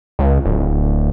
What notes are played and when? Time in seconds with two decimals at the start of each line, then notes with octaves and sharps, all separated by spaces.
0.19 C#2
0.46 D1